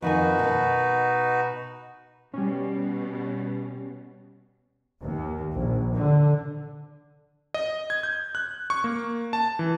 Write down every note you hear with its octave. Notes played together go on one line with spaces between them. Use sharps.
F2 D#3 D#4 F#4 B4 G#5
B2 B3
B2 G3 C#4
D#2
A#1
D3
D#5
G#6
G6
F#6
C#6
A#3
A5
E3